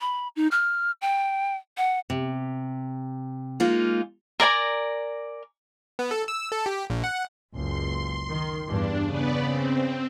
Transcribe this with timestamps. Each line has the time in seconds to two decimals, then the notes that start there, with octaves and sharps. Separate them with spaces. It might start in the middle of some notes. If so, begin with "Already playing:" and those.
0.01 B5
0.36 D#4
0.51 F6
1.02 G5
1.77 F#5
2.10 C3
3.60 G#3 A#3 D#4 F4
4.40 A#4 D5 G#5 A#5
5.99 B3
6.11 A4
6.28 E6
6.52 A4
6.66 G4
6.90 A#1
7.04 F#5
7.53 F#1 C#2 C6
8.30 D#3
8.68 E2 G2 D4
9.07 C#3 B3 B4 D5
9.43 C4